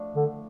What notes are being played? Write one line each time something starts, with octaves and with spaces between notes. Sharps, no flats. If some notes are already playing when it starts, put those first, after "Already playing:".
Already playing: A2 F3 A3 D4
D3